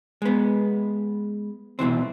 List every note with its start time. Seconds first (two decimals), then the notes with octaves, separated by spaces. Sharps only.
0.22 G#3 B3
1.79 C2 B2 E3 C4